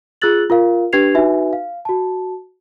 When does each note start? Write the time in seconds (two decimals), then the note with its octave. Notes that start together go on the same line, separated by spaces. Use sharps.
0.22 F4 G#4 E6 F#6 A6 F#7
0.50 F4 A#4 F5
0.93 D4 G4 B4 G#6 C7 F7
1.14 D#4 F#4 B4 E5 G#5
1.53 F5
1.85 F#4 A5